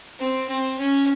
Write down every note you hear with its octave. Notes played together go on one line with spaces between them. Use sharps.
C4
C4
C#4